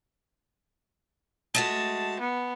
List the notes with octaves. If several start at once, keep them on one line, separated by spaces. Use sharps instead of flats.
G#3 A3 F#4 A5
B3